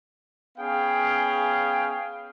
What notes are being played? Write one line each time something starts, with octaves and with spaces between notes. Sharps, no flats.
B3 C#4 G#4 F5 G5